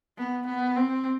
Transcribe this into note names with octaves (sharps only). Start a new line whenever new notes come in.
B3
B3
C4